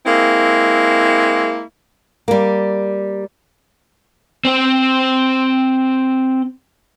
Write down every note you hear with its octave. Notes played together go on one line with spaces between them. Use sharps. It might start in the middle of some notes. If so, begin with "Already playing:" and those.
G#3 A#3 C4 E4
G3 A#3
C4 C5